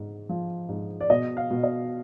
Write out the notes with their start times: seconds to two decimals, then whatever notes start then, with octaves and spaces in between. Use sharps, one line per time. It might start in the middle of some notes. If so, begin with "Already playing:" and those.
Already playing: G#2
0.29 F3
0.69 G#2
1.01 D5
1.10 B2 D#5
1.37 F5
1.51 B2
1.63 D#5